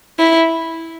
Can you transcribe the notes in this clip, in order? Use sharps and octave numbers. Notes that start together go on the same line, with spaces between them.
E4